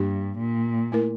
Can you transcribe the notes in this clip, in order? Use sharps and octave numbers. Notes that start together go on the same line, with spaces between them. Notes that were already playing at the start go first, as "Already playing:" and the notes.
Already playing: G2 A#3 D4 G4
A#2
A3 E4 A#4